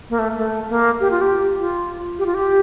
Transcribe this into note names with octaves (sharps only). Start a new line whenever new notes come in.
A#3
A3
A3
A#3
G4
F4
G4
F4
G4
F4
G4